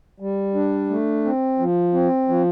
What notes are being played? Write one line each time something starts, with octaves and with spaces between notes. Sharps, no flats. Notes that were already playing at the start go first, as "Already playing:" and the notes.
G3
D4
A3
C4
F3
C4
F3